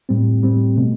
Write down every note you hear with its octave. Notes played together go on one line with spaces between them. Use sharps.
A2 G3 C4
A2 G3 C4
B2 A3